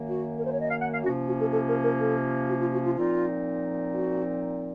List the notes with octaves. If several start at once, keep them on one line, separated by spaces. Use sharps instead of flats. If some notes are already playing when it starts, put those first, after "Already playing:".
Already playing: F#2 D#3 A#3
F#4
A#4
C5
C#5
D#5
F5
F#5
F5
C3 F3 A#3 C#4 F#4
F#4
A4
A4
A#4
A#4
A4
F#4
F4
F#4
F4
A#2 F3 C4 D#4 F4
F#4